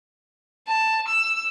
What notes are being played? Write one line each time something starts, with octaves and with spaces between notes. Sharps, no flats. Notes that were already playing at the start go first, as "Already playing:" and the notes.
A5
E6